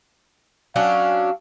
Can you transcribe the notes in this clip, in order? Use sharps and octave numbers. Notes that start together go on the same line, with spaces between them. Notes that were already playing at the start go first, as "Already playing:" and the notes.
F#3 C#4 D4 F5